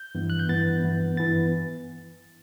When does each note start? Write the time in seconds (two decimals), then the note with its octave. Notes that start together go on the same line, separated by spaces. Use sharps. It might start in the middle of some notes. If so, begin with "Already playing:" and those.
Already playing: G6
0.15 G2 E3 B3
0.30 F#6
0.39 G6
0.49 G2 E3 B3 A6
0.83 G2 E3 B3
1.17 G2 E3 B3 A6